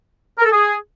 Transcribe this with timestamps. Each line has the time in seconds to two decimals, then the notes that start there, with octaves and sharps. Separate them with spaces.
0.39 A#4
0.45 A4
0.52 G#4